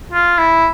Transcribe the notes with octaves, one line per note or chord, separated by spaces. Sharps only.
F4
E4